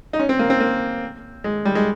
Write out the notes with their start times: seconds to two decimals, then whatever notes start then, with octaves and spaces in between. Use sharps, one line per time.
0.13 D#4
0.19 C#4
0.29 C4
0.39 A#3
0.50 C4
0.60 A#3
1.44 G#3
1.65 G3
1.75 G#3